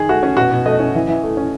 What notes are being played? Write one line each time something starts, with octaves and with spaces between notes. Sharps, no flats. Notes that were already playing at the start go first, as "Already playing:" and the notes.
Already playing: D#3 G#4
A3 F#4
C#4
B2 F#4
B2
A3 D#5
C#4
E3
E3
A3
C#4